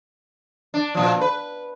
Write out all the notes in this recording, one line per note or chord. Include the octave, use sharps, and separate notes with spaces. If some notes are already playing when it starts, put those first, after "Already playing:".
D4
A#2 F3
B4